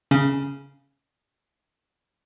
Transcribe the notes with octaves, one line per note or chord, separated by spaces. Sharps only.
C#3 C#4